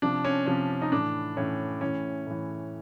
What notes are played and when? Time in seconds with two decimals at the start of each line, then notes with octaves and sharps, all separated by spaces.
0.02 C3 F3 D4
0.25 C#4
0.47 C3 F3 C#4
0.82 D#4
0.92 A2 E3 D4
1.37 A2 E3 C#4
1.81 A2 E3 C#4
2.27 A2 E3